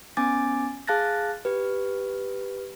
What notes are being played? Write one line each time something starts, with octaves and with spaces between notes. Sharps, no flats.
B3 C#4 G#5 D6 A6
G#4 F5 A5 F#6 A6 A#6
G4 B4